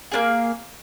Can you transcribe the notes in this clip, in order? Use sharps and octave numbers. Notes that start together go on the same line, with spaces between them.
A#3 D4 G#4